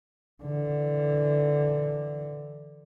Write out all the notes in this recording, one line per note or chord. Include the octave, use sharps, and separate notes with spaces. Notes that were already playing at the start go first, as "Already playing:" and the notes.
D3 E3